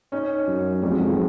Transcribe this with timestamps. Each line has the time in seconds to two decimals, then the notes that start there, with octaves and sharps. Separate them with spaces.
0.12 C#4 D#4
0.47 F#2
0.82 F2 G3 A3
0.91 F#3 G#3
1.08 D#3 F3